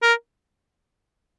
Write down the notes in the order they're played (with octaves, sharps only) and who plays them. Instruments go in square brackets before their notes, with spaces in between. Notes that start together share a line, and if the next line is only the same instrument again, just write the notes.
[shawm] A#4